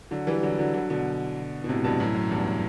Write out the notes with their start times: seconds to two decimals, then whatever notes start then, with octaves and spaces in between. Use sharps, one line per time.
0.11 D3 F#3
0.27 E3 G3
0.43 D3 F#3
0.59 D3 F#3
0.74 D3 F#3
0.90 B2 D3
1.64 B2
1.69 A2 C3
1.84 G2 B2
2.00 F#2 A2
2.15 F#2
2.31 E2 G2